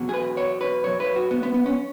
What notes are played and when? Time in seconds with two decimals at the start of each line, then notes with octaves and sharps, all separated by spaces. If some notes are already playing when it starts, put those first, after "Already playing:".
Already playing: E2 B2 F#3
0.09 G#4
0.14 B4
0.37 C#5
0.61 B4
0.84 F#2 F#3 C#5
1.00 B4
1.16 F#4
1.31 B3
1.43 B3
1.54 B3
1.66 C#4